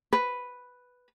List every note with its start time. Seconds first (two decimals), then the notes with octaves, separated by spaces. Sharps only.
0.13 B4